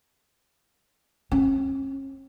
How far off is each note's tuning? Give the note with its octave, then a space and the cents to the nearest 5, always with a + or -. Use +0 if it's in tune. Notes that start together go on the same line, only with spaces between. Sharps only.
C#4 -40